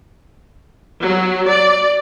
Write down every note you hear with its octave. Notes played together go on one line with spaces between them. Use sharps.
F#3
D5